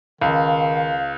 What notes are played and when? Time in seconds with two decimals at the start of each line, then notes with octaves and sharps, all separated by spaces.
0.21 C#2 D#3 F5